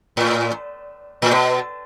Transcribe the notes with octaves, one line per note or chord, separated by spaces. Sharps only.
A2
A2
B2